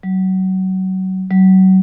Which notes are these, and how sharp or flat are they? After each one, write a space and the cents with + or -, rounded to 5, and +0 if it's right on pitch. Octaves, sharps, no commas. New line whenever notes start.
F#3 +25
F#3 +30